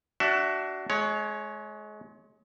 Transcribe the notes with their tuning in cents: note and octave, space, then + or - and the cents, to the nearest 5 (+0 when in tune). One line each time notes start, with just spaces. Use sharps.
D4 +0 F#4 +25 E5 +5
G#3 +30 C#5 +0